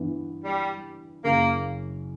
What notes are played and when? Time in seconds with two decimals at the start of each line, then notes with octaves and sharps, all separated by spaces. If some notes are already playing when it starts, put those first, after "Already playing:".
Already playing: G2 E3 B3
0.44 G3
1.24 F#1 F#2 C#3 A#3